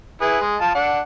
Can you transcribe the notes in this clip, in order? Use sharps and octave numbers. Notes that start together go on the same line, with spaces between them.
E4 G#4 B4
G#3
F4 A5
D4 F#5